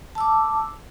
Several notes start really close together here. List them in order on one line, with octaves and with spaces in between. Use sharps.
A5 E6 D6